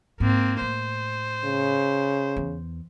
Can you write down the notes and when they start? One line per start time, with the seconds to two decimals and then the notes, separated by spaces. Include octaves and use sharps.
0.20 G#2 A#3 C4
0.61 A2 C5
1.45 C#3
2.36 E2